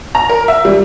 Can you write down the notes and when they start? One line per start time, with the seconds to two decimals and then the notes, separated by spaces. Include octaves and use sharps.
0.15 A#5
0.29 A#4
0.48 E5
0.65 G3